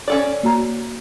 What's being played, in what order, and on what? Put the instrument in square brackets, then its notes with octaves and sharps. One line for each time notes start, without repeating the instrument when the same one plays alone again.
[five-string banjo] C#4 A4 D5
[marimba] A#3 F#4 A#5